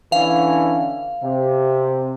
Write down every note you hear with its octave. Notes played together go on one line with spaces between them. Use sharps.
D3 E3 C#4 F5
C3